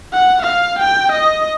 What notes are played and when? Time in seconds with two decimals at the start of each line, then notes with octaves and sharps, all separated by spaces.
0.13 F#5
0.42 F5
0.79 G5
1.12 D#5